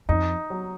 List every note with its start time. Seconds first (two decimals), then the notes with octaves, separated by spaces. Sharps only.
0.09 F2 D#4
0.50 F#3